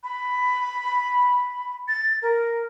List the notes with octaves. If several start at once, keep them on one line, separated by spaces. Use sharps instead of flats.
B5
A6
A#4